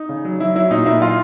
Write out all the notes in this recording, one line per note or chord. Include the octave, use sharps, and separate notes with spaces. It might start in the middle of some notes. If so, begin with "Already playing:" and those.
Already playing: D#4
C#3
F#3
F#3 E4
F#3 E4
A#2 D#4
A#2 E4
F4